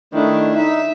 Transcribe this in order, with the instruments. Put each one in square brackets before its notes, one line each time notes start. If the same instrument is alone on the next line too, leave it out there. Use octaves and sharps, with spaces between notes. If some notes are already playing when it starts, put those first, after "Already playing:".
[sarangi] D#3 [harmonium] A3 D4 E4
[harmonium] D#4 [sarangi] E5